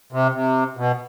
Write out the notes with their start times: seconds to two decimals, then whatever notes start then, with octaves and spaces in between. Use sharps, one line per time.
0.13 C3
0.34 C3
0.77 B2